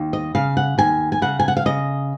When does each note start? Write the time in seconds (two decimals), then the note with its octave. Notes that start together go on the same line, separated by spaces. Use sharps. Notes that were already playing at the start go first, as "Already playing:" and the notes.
Already playing: D#2
0.13 D#5
0.35 C#3 F5
0.57 F#5
0.78 D#2 G#5
1.12 G#5
1.22 C#3 F#5
1.40 G#5
1.48 F#5
1.57 F5
1.66 C#3 D#5